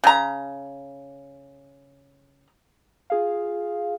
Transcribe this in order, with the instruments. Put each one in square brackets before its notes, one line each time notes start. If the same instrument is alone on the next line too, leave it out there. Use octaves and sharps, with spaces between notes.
[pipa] C#3 A#5
[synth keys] F4 G#4 F5